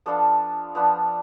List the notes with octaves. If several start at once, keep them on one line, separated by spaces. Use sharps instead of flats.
F3 B3 D4 F4 A4
F3 B3 D4 F4